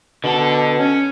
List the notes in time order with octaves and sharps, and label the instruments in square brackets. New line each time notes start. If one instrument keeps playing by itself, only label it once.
[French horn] B2 [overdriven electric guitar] D3 A4
[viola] C#4